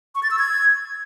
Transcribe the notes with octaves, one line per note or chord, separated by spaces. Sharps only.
C#6
A6
E6
G#6